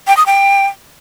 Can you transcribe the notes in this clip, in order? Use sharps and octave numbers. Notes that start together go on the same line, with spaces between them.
G5
D#6
G5